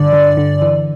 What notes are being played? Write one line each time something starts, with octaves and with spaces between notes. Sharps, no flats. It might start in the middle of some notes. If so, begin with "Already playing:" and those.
Already playing: G2 D3 D5
D3
D3
E3